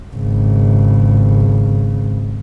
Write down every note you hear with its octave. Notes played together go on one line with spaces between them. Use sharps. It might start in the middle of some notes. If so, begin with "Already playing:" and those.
G#1 C#3